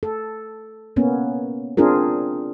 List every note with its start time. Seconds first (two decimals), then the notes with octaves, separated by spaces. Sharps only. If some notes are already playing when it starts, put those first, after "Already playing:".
0.03 A4
0.96 A#3 B3 C#4
1.77 C4 D4 F4 G#4 A#4